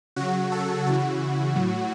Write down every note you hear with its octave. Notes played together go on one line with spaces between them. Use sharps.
C#3 F#3 F#4
A4
C#3 E3 F#4
A2 F#3